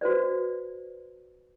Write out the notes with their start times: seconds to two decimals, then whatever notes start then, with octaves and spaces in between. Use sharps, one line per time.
0.01 F#4 B4 C5 D5